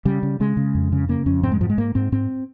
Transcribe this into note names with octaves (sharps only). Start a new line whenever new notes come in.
C#3 G3
C#3
C#3 G#3
C#3
F2
C#3
C#3 A#3
F2 C#4
G#2 C4
G#3
G#2 F3
G#3
G#2 A#3
G#2 C4
G#2 C4